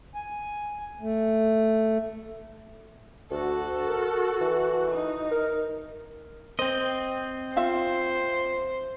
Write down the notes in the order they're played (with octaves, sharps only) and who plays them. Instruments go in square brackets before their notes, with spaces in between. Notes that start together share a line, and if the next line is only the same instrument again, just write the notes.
[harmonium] G#5
A3
[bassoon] D2 [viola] F#4 A4
[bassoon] A#4
E3
[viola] D#4
[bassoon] A#4
[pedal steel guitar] C4 D#5 [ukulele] C5
[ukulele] F4 E5 F5 [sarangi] C5